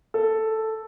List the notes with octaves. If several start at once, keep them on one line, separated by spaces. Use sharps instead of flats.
A4